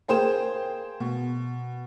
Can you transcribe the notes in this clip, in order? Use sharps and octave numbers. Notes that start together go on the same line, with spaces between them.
A#3 G#4 C5 G5 E7
B2